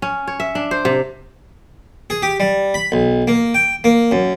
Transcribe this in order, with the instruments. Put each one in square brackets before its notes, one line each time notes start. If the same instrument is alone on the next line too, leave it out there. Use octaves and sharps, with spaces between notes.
[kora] C#4
C#5
E5
D4
C5
C3
[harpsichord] G#4
G4
G3
B5
B1
A#3
G5
A#3
F#2